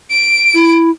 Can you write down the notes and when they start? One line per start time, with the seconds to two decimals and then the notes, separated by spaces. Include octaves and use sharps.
0.11 D7
0.54 E4